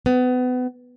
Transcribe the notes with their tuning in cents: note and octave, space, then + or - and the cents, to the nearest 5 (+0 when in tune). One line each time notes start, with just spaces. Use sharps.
B3 +30